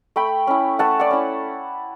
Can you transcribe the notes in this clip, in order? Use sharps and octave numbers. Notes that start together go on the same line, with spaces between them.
A3 G5 B5
C#4 E4
A3 F#5 A5
D5 F#5
C#4 E4